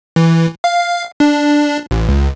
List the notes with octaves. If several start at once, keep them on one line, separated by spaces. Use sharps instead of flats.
E3
F5
D4
A1
C#2